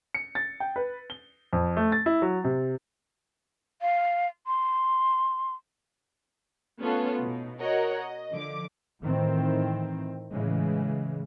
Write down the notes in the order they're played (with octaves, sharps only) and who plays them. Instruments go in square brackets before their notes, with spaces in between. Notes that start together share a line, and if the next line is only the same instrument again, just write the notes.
[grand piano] C#7
A6
G5
B4
G7
F2
A3
A6
E4
F#3
C3
[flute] F5
C6
[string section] A3 B3 C#4 F4 A4
B2 D#4
F#4 A#4 C#5 D#5 F#5 A#5
D#5
D3 F3 D6
[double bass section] A2 D#3 E3 C4
A2 C#3 E3 G#3